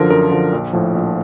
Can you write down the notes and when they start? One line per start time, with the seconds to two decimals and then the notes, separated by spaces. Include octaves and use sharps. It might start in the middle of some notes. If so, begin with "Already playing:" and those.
Already playing: F#2 D3 F3 A#4
0.10 F#2 A#4
0.31 D3 F3
0.53 A#1
0.73 A2 F3
0.95 A#1